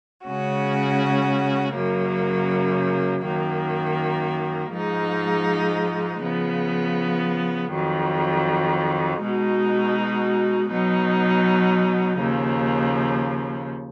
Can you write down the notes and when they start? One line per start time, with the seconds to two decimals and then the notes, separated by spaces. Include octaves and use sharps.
0.25 C#3 G#3 C#4 F#4
1.74 F#2 C#3 F#3 A#3
3.23 F#2 D#3 A#3
4.73 G#2 F3 G#3 D#4
6.21 C#3 F3 B3
7.71 F2 D#3 F#3
9.19 B2 G#3 D#4 F#4
10.70 B2 F#3 B3 D#4
12.18 D#2 C#3 F3